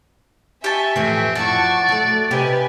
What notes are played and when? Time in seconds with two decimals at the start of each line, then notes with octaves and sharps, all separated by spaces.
0.64 G4 E5 G#5 A5 C#6
0.96 F2 A2 E3 C4
1.35 F#2 F3 E4 D5 F#5 A5 C#6
1.89 F#3 A3
2.31 C3 D#4 G4 B4 G#5